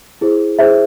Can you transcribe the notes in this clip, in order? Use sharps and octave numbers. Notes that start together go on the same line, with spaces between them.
E4 G#4 C5
E4 G#4 C5 E5